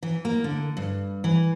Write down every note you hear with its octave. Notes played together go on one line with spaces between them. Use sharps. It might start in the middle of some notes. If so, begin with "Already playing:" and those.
E3
A#3
D3
G2
E3